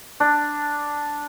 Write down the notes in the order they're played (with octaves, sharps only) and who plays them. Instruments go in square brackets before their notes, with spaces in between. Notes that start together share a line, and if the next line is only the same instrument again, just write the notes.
[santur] D4